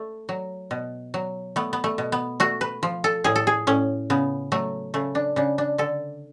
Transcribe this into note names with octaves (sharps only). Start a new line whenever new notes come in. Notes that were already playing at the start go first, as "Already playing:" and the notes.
Already playing: A3
F#3
B2
F#3
A3 B3
B3
A3
B2
B3
A3 F#4
B4
F3
A4
A2 G#4
A4
G#4
A2 C#4
C#3 B3
F#3 A3
C#3 A3
D4
C#3 D4
D4
D3 A4